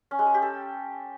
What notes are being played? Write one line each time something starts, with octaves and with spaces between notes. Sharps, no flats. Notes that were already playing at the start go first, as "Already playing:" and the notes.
C#4
G#3
G#4
G4
A4